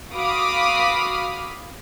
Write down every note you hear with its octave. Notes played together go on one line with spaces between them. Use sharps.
F#4 F5 B5 D6 D#6 F6